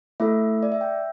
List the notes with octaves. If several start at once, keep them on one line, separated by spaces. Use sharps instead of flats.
A3 E4 A4 E5
D5
E5
G5